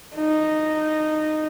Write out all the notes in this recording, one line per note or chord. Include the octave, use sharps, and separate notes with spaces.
D#4